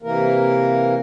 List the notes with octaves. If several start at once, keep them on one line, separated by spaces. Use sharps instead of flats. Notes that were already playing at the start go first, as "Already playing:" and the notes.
C3 E3 A#3 A#4